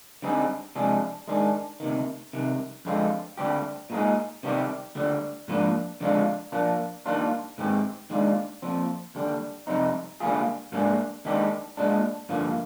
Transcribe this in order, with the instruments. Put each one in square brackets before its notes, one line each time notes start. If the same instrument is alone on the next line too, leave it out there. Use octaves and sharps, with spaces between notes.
[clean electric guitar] D3 G3 C4 D#4 G#4
C3 F3 G#3 D4 G#4
D#3 G#3 D4 G#4
D2 C3 D#3
C2 C3 D#3
F2 D3 G#3 C4 F4
D2 D3 G3 C4 G4
A#2 G#3 D#4 G#4
C3 D#3 G3 C4 G4
D2 D3 G3
G#2 F3 A#3 D4
F2 D3 G#3 D4 F4
A#2 F3 A#3 D4
D#3 G3 A#3 D4 F4
G#2 D#3 G#3 C4 G4
D#2 D#3 G#3 D4 F4
A#2 F3 C4
D#2 D3 G3
F2 C3 G3 C4 D#4
D3 G3 A#3 F4 G#4
G#2 G3 A#3 D4 G#4
D#2 D#3 G#3 D4 G4
A#2 G#3 D4
G2 D3 F3 A#3